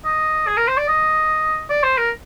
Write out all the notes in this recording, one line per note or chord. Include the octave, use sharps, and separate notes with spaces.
D#5
G#4
A#4
C5
D5
D#5
D5
C5
A#4